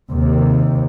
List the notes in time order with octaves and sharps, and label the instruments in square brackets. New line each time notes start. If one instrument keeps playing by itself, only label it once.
[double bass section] D#2 C3